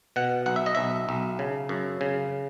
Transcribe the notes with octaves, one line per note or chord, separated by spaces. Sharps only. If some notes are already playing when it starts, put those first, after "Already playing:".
B2 F#5
B1 F#5
E5
D#5
B1 E5
B1
C#3
F#2
C#3